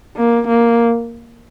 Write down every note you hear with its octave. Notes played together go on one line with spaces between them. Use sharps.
A#3
A#3